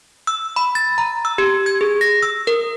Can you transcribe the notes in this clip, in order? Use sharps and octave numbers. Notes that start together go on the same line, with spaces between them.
E6
B5
A6
A#5
E6
G4
G#6
G#4
A#6
E6
A#4